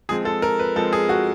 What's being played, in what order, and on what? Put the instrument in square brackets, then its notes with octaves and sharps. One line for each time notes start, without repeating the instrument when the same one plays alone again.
[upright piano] F3 G#3 C4 G#4
A4
A#4
B4
F3 G#3 C4 A4
G#4
F#4